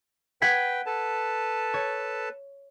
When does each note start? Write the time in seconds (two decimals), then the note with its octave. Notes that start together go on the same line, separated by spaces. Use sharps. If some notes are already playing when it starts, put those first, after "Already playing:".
0.42 B4 F#5 G5 G#6 B6
0.86 A4 B4 A5
1.74 C#5